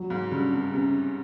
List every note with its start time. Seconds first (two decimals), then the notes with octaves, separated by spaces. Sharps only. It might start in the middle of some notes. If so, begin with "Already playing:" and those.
Already playing: F#3
0.10 G#2
0.31 G2 C#3
0.53 C3
0.73 C3 C#4